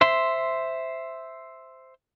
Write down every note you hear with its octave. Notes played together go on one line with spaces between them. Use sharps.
C5 E5 C6